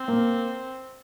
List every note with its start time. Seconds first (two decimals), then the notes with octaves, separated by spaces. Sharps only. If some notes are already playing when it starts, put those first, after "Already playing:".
Already playing: C4
0.08 A#3